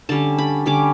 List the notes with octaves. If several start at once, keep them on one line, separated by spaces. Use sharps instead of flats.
D3 G3 C#4 A5
B5
D3 G3 C#4 D6